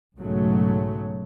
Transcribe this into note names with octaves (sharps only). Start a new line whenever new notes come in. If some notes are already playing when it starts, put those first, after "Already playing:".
B1 G#2 C#3 F#3 A3